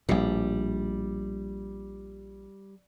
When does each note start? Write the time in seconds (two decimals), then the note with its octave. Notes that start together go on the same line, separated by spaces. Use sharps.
0.09 A#1 A2 G3